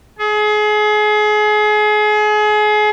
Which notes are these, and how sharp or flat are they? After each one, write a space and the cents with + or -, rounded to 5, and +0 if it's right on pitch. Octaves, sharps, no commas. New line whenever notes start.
G#4 +30